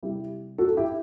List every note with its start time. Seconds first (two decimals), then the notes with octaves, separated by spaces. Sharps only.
0.03 C3 G3 E4 G4
0.58 F#4 A4
0.77 E4 G4